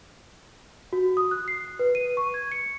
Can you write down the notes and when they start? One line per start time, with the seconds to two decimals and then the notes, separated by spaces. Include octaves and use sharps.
0.93 F#4
1.17 D#6
1.31 F#6
1.48 C7
1.79 B4
1.95 D#7
2.17 C#6
2.34 G#6
2.52 C#7